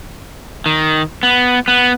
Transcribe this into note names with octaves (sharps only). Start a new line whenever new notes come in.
D#3
B3
B3